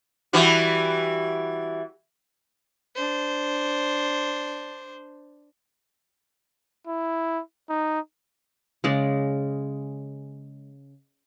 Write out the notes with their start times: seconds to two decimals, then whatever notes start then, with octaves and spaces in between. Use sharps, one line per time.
0.33 E3 G3 F#4
2.96 D4 C5
6.87 E4
7.70 D#4
8.84 C#3 G#3 D5